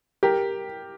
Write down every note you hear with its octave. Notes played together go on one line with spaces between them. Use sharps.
G4 A#4